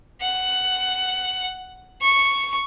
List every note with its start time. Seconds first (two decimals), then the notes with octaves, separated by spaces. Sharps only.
0.21 F#5
2.01 C#6